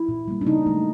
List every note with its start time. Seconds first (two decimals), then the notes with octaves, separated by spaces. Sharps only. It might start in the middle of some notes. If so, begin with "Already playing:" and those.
Already playing: E4
0.09 A#2
0.28 G3 A#3
0.41 D4
0.47 C#3 D#4
0.67 F#3 A3